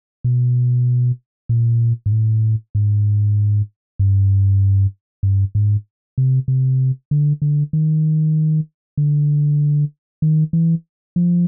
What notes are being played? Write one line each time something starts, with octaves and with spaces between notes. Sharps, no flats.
B2
A#2
G#2
A2
G#2
G2
G2
G#2
C3
C3
D3
D3
D#3
D3
D#3
E3
F3